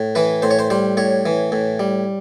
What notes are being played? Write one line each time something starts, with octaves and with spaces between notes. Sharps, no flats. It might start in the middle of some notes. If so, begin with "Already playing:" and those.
Already playing: A2
E3 B4
A2 C5
C#5
C5
G3 C5
A2 C#5
E3
A2
G3